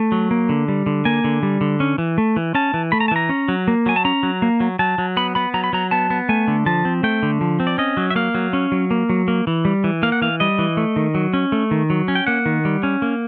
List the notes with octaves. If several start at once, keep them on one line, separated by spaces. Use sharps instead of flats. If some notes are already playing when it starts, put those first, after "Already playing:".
Already playing: A3
F#3
A#3
D3
G3
D3
A#3 G#5
D3
G3
D3
C#4
E3
A3
E3
C#4 A5
E3
A3 B5
A#5
A5
E3 A#5
C#4
F#3
A#3
F#3 G#5
A5
C#4 A#5
F#3
A#3
F#3
F#3 A5
F#3
B3 B5
B3 B5
F#3 A#5
B5
F#3 A#5
B3 A5
B3
A3 G#5
D3
F3 A5
C4
A3 G5
D3
F3
C4
D5
C#4 D#5
F#3
E5
A#3 F5
F#3
C#4
F#3
A#3
F#3
A#3
E3
G3
E3
A#3 F5
F#5
E3 F5
G3 D#5
E3
A3
D#3
F#3
C#4
A3
D#3
F#3
C#4
G5
A#3 F#5
D#3
G3
C#4
A#3